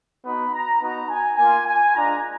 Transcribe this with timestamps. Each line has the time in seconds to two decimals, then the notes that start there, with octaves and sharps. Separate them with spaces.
0.25 B3 D#4 F#4 B5
0.53 A#5
0.81 B3 D#4 F#4 A#5
1.10 G#5
1.38 A#3 F4 G#5
1.66 G#5
1.94 G#3 D4 F4 A#5